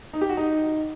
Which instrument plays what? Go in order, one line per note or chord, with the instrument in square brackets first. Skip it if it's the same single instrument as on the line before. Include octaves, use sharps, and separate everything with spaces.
[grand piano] D#4
G4
F#4
D#4